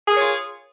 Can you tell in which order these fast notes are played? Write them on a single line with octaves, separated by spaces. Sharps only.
G#4 A#4 C#5 F4